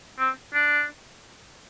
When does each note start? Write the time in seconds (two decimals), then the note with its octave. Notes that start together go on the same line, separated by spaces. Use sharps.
0.19 C4
0.54 D4